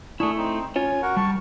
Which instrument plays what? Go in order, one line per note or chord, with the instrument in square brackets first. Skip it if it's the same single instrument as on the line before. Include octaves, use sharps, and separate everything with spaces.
[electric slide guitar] A3 E4 [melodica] D4 G#4 C#6
[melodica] C4 D#4
[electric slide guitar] C#4 F4 C#5 [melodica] G#5
[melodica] F#4 A#4 F#5
[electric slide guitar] G3 [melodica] A5 C#6